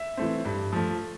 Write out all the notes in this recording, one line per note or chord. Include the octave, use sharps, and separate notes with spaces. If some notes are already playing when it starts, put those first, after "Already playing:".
Already playing: E5
E3 A3 C4
G2
F3 A3